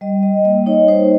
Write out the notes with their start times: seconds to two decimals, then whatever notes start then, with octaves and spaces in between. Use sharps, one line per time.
0.01 G3 D#5
0.23 G3 D#5
0.45 A#3 D#5
0.66 D#4 C#5
0.88 D#4 C5